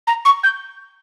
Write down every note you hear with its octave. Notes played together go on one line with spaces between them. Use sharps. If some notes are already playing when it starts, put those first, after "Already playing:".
A#5
C#6
G6